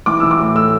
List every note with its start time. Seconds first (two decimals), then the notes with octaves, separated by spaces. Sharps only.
0.06 E3 D6
0.20 E3 E6
0.31 D6
0.39 A2
0.55 A3 E6